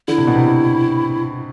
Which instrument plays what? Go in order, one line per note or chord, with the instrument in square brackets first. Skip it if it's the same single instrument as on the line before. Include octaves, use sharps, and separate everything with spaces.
[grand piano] D3 [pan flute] E4
[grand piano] C3
B2
C3